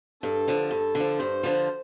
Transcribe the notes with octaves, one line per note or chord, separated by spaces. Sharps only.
G2 A4
D3 F3
G2 A4
D3 F3
G2 C5
D3 F3